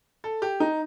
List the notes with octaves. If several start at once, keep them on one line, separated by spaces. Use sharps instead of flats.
A4
G4
D#4